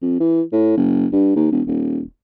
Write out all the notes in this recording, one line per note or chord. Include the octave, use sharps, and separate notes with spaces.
F2
E3
A2
F#1
G2
D#2
E1
D#1